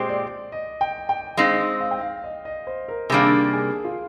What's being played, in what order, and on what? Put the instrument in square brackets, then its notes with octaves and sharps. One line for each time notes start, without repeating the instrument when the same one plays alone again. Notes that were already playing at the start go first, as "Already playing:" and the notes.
Already playing: [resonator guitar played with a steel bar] A#2 G#3 C4 G4 C5
[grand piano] D5
D#5
G5
G5
[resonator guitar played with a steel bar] G#3 C4 D#4 [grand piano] F5
[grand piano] F5
G5
F5
D#5
D#5
C5
A#4
[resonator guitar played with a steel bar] C3 D#3 G3 A#3 D4 [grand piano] G#4
[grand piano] G#4
F4